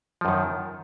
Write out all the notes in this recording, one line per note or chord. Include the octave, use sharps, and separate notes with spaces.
F#2 D#3 F3